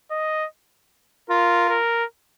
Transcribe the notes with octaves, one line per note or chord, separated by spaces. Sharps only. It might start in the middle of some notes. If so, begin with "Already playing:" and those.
D#5
F4 A#4
A#4